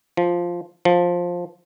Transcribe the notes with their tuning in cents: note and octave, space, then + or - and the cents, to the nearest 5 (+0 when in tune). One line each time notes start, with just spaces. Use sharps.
F3 +0
F3 +10